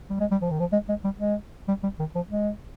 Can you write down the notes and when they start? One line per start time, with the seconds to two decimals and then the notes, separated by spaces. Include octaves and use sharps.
0.10 G3
0.20 G#3
0.31 G3
0.42 F3
0.51 D#3
0.60 F3
0.72 G#3
0.89 G#3
1.04 G3
1.20 G#3
1.68 G3
1.83 G3
1.99 D#3
2.15 F3
2.30 G#3